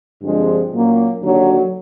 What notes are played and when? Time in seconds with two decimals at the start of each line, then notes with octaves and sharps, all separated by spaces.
0.21 G2 D3 F3 G#3 C4
0.71 A#2 F#3 A#3 C#4
1.21 D#2 D3 F#3